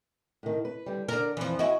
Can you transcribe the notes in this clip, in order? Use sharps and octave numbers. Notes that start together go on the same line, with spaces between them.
A2 D#3
B4
D3 G3
D3 D4 A#4
F2 E3 F3
E4 F#4 D#5 E5 G#5